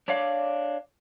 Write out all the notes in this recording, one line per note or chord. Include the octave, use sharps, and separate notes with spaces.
D4 C#5 D5 F5